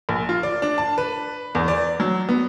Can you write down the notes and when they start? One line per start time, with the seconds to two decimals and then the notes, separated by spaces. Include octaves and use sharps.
0.09 A#1
0.29 F4
0.43 D5
0.62 D4
0.78 A5
0.98 B4
1.55 E2
1.68 D5
2.00 F#3
2.29 B3